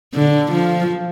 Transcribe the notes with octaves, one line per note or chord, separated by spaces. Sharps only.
D3
F3